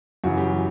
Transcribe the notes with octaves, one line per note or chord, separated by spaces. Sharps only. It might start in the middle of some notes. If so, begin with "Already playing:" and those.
F#2 C#3 E3 F#4
G4